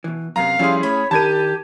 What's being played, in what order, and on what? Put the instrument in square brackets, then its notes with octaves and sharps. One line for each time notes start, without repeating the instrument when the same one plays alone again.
[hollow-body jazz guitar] B2 E3
[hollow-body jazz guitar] F#2 C3 B3 [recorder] F5 [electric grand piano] A#5
[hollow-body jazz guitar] F3 G3 [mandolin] A3 F4 [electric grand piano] C#4 E4 G#4
[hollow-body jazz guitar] A2 [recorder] C#5 [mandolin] B5
[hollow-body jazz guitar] D#3 D4 A#4 [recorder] G4 [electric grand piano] A5 G#6 D#7